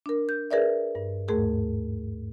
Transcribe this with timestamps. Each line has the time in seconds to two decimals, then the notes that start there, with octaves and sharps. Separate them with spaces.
0.06 D4 A#4
0.29 G6
0.51 G#4 A#4 B4 D5 E5
0.95 G2
1.28 D#2 G#2 A3 G#4 A#4